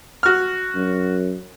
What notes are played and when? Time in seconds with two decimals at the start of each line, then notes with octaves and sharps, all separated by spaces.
0.23 F#4 F6
0.75 F#2